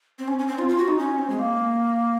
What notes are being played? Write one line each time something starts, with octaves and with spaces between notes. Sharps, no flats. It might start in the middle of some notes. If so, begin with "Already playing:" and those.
C4
C#4
C#4
C4
F4
F4
F#4
D#4
C#4
C4
G#3
A#3